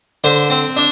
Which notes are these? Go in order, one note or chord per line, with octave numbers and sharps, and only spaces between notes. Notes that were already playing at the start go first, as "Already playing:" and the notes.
D3 C5
C4
D4